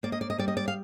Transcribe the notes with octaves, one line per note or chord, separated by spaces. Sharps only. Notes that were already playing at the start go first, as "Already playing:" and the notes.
A#3 D5
D#5
D5
D#5
G3 D5
D#5
D5
F5